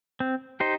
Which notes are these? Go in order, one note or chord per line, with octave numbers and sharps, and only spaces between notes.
C4
D#4 G4 C5